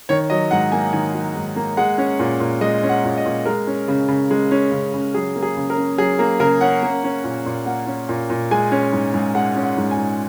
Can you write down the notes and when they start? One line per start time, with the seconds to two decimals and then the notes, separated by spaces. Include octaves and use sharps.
0.09 D#3 C#5
0.30 F#3 D#5
0.51 G#2 F#5
0.72 A#3 G#5
0.93 D#3 G#5
1.14 F#3
1.36 G#2
1.56 A#3
1.77 G#3 F#5
1.98 C#4
2.19 A#2
2.40 A#2
2.61 G#3 D#5
2.83 C#4
2.89 F#5
3.04 A#2
3.18 D#5
3.25 A#2
3.46 G#3 A#4
3.67 C#4
3.88 C#3
4.08 C#3
4.31 G#3
4.51 C#4
4.71 C#3
4.94 C#3
5.14 F#3 G#4
5.36 A#3
5.42 G#4
5.56 C#3
5.70 A#4
5.78 C#4
5.98 F#3 G#4
6.19 A#3
6.40 C#3 A#4
6.61 C#4 F#5
6.83 A#3
7.04 C#4
7.24 A#2
7.46 A#2
7.66 A#3 F#5
7.87 C#4
8.09 A#2
8.30 A#2
8.51 G#3 G#5
8.72 C#4
8.93 G#2
9.14 G#2
9.35 G#3 F#5
9.56 C#4
9.64 F#5
9.77 G#2
9.91 G#5
9.98 G#2